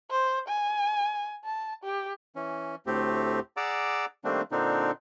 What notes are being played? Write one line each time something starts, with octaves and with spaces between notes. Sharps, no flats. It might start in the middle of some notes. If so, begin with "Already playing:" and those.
C5
G#5
A5
G4
E3 C#4
D2 A2 A3 C4 G4
G#4 D5 F#5 A#5 D6 E6
D#3 G3 A3 A#3 C4 D4
A#2 D3 C4 D4 D#4